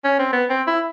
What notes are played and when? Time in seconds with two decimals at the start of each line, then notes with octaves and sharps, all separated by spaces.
0.05 C#4
0.19 C4
0.33 B3
0.50 C4
0.67 E4